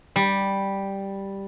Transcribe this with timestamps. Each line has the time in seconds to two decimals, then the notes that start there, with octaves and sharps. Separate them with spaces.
0.16 G3